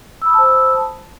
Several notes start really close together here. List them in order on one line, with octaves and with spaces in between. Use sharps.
E6 B5 D#6 A5 C5